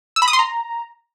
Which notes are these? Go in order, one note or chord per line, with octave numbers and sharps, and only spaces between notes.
E6
B5
D#6
C6
A#5